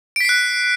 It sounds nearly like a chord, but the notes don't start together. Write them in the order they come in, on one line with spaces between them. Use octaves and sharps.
D7 B6 C7 F#6